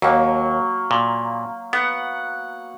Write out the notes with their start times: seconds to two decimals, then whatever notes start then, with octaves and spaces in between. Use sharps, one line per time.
0.02 D#2 F#3 A#3
0.91 A#2
1.73 B3 F#5